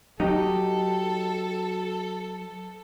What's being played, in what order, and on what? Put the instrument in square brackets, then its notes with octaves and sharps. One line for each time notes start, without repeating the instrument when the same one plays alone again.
[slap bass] F#3 [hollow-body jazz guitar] D#4 G4 D#5 [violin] A4